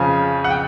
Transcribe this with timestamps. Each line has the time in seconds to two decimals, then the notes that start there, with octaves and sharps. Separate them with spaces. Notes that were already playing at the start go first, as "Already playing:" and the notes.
Already playing: F2 C#3 F3 G#5
0.44 F#5
0.50 G5